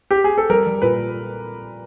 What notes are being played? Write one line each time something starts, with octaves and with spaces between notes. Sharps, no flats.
G4
G#4
A4
G3 A#4
G3
A#2 B4